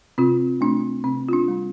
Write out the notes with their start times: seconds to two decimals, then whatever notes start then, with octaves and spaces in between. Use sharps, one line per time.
0.18 C3 C4 F4
0.61 A3 C4 D4
1.04 C3 C4
1.28 F4
1.33 D4
1.48 G3 C4